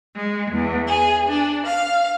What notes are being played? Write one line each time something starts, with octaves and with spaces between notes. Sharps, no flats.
G#3
E2
G#4
D4
F5